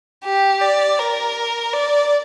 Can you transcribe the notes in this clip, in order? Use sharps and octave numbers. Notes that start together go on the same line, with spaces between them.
G4
D5
A#4
D5